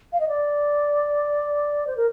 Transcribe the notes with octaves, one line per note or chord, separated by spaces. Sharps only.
F5
D#5
D5
C5
A#4